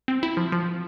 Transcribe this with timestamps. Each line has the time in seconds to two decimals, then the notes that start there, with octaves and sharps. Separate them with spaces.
0.08 C4
0.23 E4
0.37 F3
0.52 F3